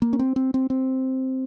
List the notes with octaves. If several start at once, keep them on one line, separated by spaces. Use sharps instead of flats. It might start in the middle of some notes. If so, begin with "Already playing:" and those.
A#3
C#4
C4
C4
C4
C4